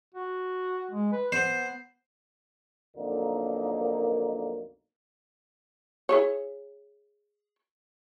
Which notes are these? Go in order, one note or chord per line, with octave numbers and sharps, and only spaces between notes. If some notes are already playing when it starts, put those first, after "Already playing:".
F#4
G#3
B4
B3 C5
B1 F2 D3 A#3 D#4 A#4
E4 G#4 C#5